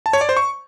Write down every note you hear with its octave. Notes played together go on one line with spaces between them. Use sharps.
A5
C#5
D5
C5
C#6